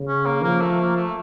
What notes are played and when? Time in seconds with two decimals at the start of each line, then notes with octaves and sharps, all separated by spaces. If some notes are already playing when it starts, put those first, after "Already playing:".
Already playing: C#3
0.08 C#4
0.26 A#3
0.43 F3 A#3
0.61 A3
0.79 A#3
0.96 A3